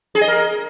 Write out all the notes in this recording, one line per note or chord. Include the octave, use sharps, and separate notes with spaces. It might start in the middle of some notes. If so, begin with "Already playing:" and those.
G#4
D#5
A#4